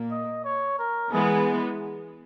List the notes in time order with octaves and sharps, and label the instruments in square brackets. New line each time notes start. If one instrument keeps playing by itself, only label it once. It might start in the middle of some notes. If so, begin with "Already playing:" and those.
Already playing: [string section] A#2 A#3
[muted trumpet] D#5
C#5
A#4
[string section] E3 G#3 B3 [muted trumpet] G#4